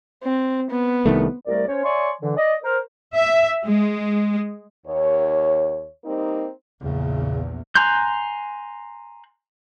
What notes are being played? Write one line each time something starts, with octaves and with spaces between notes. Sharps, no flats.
C4
B3
C2 D#3 A3
C2 G3 A3 A#4 D5
C#4 C5 C#5
C#5 D5 E5 G#5 C6 C#6
D3 E3
D5 D#5
A#4 C5
E5
G#3
D#2 C#5
G3 A#3 C4 D#4
A#1 E2 C#3
G#5 A#5 C6 F#6 G6